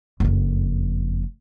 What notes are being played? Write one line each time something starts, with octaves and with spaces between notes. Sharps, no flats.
F#1 F2